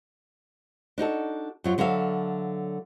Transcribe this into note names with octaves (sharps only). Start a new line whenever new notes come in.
D4 D#4 F#4 A4
F#2 F#3 F4
D3 F#3 A4 E5 F5